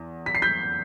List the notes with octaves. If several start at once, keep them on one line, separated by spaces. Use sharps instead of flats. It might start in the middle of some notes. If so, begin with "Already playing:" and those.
Already playing: E2
B6
C7
G6 B6